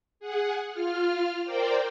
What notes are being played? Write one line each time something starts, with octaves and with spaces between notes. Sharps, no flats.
G#4 F#5
F4 F6
A#4 C5 D5 G5